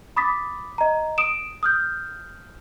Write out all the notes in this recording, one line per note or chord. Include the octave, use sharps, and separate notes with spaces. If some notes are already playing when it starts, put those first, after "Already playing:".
B5 D6 D#6 A6 B6
D#5 A#5
D#6 D7 E7
D#6 F6 G6